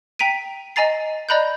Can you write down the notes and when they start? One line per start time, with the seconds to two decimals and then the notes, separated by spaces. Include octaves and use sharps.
0.19 G5 A#5 B6 D7 D#7
0.76 D#5 G#5 A#5 A6 C7
1.29 D5 D#5 A#5 B5 F#6 G6